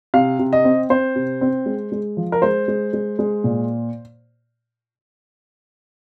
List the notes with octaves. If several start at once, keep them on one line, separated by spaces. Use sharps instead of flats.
C3 F5
C3
D#5
C4
C4 C5
C3
C4
G#3
G#3
F3
A#4
G#3 C5
G#3
G#3
G#3
A#2